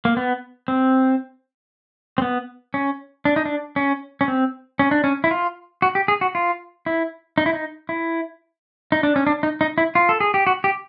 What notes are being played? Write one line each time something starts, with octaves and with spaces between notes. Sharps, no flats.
A#3
B3
C4
C4
B3
C#4
D4
D#4
D4
C#4
C#4
C4
C#4
D4
C#4
E4
F4
F#4
G4
G#4
F#4
F4
E4
D#4
E4
D#4
E4
D#4
D4
C#4
D4
D#4
D#4
E4
F4
A4
G#4
G4
F#4
G4